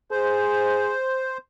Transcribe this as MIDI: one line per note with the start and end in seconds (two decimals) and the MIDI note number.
0.11 0.94 68
0.11 1.38 72